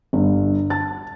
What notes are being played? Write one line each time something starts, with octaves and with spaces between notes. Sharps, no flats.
G1
A5 A6